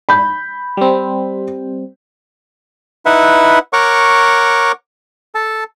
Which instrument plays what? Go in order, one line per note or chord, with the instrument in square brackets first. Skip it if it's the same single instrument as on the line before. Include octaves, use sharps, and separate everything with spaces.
[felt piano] B5 G6
[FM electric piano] G3 C4
[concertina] D#4 E4 B4 E5 F#5
A#4 C#5 F#5 C#6 D6
A4 A5